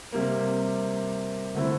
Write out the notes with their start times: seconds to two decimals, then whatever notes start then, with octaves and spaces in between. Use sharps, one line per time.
0.12 C3 G3 A#3
1.55 D3 A3 C4 E4